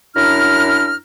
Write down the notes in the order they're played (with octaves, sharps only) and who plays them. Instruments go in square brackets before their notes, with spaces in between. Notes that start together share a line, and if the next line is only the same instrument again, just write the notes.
[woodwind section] F#2 D4 E4 A#5 F6